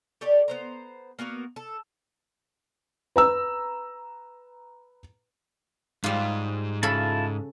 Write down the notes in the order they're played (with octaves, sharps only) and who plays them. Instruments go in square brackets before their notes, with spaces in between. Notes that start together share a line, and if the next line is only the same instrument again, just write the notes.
[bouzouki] G4 A4 C#5 D5
B3 C5 A#5
A#3 B3 F#4 A#4
A4
[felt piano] B4 A#5 E6
[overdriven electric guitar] G#2 [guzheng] G3 F4
[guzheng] C#3 A4 B5 [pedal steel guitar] E4 F4 A5